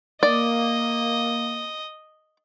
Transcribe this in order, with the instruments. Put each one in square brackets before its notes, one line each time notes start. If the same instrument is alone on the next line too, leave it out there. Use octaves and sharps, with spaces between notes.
[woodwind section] A#3 [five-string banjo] D5 [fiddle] D#5